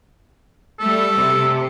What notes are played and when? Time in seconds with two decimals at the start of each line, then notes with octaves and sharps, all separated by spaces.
0.80 G3 A3 A4
1.14 C3